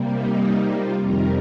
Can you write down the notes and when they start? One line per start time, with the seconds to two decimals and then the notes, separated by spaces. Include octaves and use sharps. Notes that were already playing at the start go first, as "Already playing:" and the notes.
Already playing: C3 G3 A#3
0.12 D#4
0.71 F4
1.00 F2 C3 D#3 G3 A#4